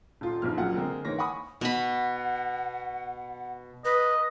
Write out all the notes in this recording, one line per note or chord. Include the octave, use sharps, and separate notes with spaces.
D#1 F4 C6
A#1 G#2 B2 F3 F6
E1 F#2 A#2 F#3 F4 F#5
D3 G#3 C4 A#4
G#2 E3 A#3 C#5 A#6
F#5 G#5 B5 C#6 D#6
B2 F#5 B5
B4 D#5